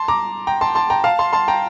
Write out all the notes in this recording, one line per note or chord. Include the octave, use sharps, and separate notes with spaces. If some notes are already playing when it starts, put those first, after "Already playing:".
Already playing: A5 C6
A#5 D6
G5 A#5
A5 C6
A5 C6
G5 A#5
F5 A5
A5 C6
A5 C6
G5 A#5